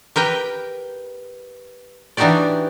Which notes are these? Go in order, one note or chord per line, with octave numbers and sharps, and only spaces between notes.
G4 A#4 B4 G5
E3 D4 D#4 F#4 G4 D5